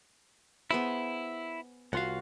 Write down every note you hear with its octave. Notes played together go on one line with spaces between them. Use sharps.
B3 E4 G#4 C5
C2 F4 F#4 F5 F#5